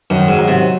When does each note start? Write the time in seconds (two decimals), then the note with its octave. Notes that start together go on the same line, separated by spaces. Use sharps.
0.10 F#2 D#3
0.28 G#2
0.38 F#3
0.48 C3